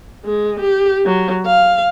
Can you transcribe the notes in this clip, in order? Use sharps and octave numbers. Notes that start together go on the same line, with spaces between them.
G#3
G4
F#3
F5